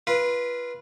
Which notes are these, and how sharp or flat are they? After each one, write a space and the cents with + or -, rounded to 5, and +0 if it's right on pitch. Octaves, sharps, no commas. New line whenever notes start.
F4 -20 B4 -20